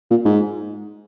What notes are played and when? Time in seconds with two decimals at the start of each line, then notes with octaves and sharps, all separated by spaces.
0.10 A#2
0.25 G#2